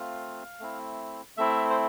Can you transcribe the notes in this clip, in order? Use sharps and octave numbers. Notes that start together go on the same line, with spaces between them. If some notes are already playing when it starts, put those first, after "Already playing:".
Already playing: A3 C4 F4 F5
A3 C4 E4
A3 C4 E4 E5
C5